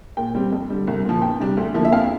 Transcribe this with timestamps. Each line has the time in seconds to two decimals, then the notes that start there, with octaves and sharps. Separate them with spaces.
0.17 A#2 G5
0.35 G3 C4
0.52 F2
0.70 D3 G3
0.87 C2
1.05 A#2 F3
1.22 E2 G5
1.40 C3 G3 D4
1.57 D2
1.74 D3 F3 A#3 E4
1.85 E5
1.92 F2 F5